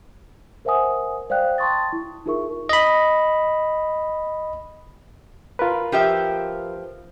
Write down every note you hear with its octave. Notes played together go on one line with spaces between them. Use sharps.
A#4 C5 E5 F#5 G#5 D#6
C5 D5 F5 G5 F#6
G5 A5 C6 C#6 D#6 A6
E4
D#4 F4 G#4 A#4 E5 C#6
D#5 B5
F4 A#4 B4
F3 G4 E5